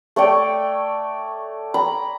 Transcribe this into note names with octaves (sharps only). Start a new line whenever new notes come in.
A3 C#5 D5 G5
A#5 B5